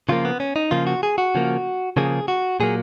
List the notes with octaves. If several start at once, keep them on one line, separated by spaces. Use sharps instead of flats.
C#3 F3 A#3 F4
B3
C#4
D#4
C#3 F3 A#3 F4
F#4
G#4
F#4
C#3 F3 A#3
C#3 F3 A#3 G#4
F#4
A#2 F#3 A#3 G#4